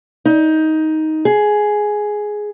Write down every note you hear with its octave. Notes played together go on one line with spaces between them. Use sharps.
D#4
G#4